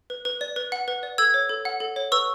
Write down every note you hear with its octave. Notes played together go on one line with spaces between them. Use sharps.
B4
B4
D5
B4
F#5
B4
D5
A4 E6 G#6
C#5
A4
F#5
A4
C#5
B4 C#6 E6